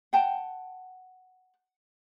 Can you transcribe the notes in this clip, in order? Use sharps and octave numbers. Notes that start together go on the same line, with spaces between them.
F#5 G5 A5